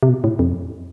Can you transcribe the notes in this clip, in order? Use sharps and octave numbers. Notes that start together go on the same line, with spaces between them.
C3
B2
A2
F2